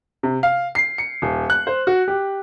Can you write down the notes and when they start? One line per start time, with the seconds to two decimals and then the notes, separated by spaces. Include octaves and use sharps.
0.23 C3
0.43 F5
0.75 C7
0.98 C#7
1.22 D#1
1.50 F#6
1.67 C5
1.87 F#4
2.08 G4